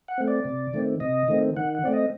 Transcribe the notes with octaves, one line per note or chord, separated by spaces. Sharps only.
F#5
A3 C4
D5
C3
D#3 A3 C4
C3 D#5
D#3 A3 C4
D#3 F#5
F#5
A3 C4 D5
D#5